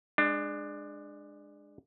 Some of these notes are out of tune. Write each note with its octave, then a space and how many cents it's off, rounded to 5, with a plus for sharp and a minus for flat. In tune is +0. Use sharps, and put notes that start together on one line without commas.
G#3 -10 D4 +20